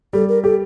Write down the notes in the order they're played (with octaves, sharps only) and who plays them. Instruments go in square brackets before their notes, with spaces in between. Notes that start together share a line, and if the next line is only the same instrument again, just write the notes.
[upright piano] G3 [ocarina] A4
[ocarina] A#4
[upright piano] G4 [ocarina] A4